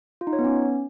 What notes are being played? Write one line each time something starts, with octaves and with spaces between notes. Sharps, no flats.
F4
D#4
C#5
B3
C#4